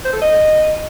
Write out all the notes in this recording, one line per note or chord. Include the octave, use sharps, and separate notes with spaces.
C5
A4
D#5